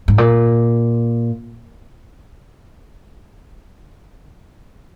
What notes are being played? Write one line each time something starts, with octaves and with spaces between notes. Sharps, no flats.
G#2
A#2